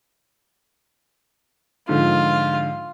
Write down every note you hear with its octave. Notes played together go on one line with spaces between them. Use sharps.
G#2 D3 F3 F4